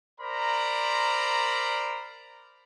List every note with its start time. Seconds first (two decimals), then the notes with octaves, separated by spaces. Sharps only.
0.20 A#4 C5 D5 A#5 B5